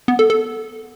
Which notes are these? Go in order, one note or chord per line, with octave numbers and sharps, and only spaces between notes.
B3
A4
A4